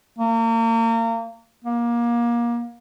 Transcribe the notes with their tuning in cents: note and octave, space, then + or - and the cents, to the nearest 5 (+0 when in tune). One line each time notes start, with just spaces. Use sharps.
A#3 -35
A#3 +25